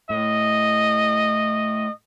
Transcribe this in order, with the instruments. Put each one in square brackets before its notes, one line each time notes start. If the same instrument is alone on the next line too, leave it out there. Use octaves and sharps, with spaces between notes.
[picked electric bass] A2 [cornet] D#5